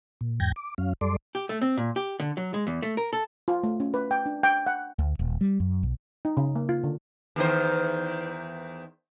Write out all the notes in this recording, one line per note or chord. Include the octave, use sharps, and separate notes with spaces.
A#2
E2 G#2 G5 G6 G#6 A#6
D6
F#2 F#3 C#4 F5
F#2 G3 A4 D5 C6 D6
G4
A3
C4
A#2
G4
D3
F#3
G#3
E2
A3
A#4
A4
F4
A3
C#4
B4
G5
D4
G5
F#5
D2
D#1
G3
F#2
B1
D#4
C#3
A#3
F4
D3
E2 D#3 C5